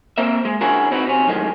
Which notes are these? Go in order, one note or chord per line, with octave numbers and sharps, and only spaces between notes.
A#3 C4 A#4 E5
G#3
D3 C#4 E4 F#4 G#4 A#4
C4 D#4 F#4 B4
C3 C#4
F#2 A2 D#3 G#3